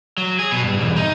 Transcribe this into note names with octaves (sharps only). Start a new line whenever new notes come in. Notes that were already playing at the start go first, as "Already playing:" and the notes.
F#3
G#4
B2
G2
B1 E2
D#4